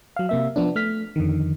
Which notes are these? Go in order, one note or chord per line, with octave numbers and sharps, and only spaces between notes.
F#3 F5
C3 A#3 E5
F3 B3 D4
A3 F6 B6
F2 D3 D#3